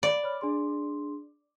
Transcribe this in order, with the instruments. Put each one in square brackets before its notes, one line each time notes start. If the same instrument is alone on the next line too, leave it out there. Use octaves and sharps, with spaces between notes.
[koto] D5 [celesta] F5 B5
[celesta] C#5 B5 F6
D4 G#4 C6